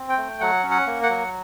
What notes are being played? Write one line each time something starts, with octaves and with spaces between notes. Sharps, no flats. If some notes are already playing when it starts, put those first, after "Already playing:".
Already playing: C4
G5
A3
F#3 F#5
C#4
F#5
A#3
F#5
F#3